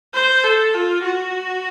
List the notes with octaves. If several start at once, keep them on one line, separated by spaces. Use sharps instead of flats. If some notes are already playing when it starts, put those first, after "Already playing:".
C5
A4
F4
F#4